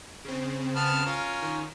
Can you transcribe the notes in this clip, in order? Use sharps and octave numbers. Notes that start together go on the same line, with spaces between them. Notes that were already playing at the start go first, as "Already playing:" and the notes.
C#3 C4
B3 A5 F6
C#4 F4 A#4
D#3